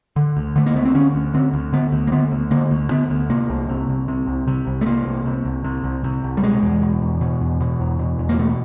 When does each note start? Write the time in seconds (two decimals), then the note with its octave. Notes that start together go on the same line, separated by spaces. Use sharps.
0.16 D3
0.37 D2
0.56 D3 A3
0.66 A#3
0.76 D2 B3
0.85 C4
0.95 D3 C#4
1.15 D2
1.34 D3 C4
1.54 D2
1.73 D3 B3
1.92 D2
2.07 A#3
2.12 D3 B3
2.32 D2
2.51 D3 A#3
2.71 D2
2.91 D3 B3
3.10 D2
3.30 C3 A#3
3.50 C2
3.69 C3
3.89 C2
4.08 C3
4.28 C2
4.48 C3
4.67 C2
4.81 A3
4.86 C3 A#3
5.06 C2
5.25 C3
5.45 C2
5.64 C3
5.84 C2
6.04 C3
6.24 C2
6.37 G3
6.43 B2 G#3
6.63 E2
6.82 B2
7.02 E2
7.21 B2
7.41 E2
7.61 B2
7.80 E2
7.99 B2
8.19 E2
8.29 A#3
8.39 B2 A3